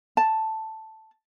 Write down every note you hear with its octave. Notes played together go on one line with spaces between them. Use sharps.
A5